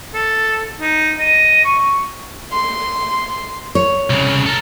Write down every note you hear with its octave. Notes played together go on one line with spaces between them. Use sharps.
A4
D#4
D#5
C#6
C6
C#5
C2 C#3
A4 A#4